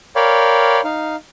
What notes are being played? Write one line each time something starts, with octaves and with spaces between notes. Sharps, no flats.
A#4 C#5 D5 F5 G5 B5
D#4 F5